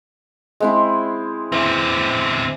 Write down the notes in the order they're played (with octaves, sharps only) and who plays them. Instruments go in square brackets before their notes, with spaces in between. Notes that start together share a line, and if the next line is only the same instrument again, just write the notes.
[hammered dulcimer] G#3 C4 E4
[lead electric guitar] D3 C4 [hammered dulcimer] E3